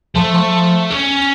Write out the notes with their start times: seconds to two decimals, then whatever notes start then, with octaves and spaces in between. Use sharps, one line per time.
0.15 F3 A3
0.33 F3
0.52 F3
0.90 C#4